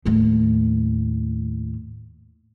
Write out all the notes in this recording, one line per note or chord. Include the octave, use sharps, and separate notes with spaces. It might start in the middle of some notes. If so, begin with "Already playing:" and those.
D#2 A2